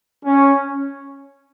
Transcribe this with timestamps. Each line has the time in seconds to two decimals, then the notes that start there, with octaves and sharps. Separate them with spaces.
0.25 C#4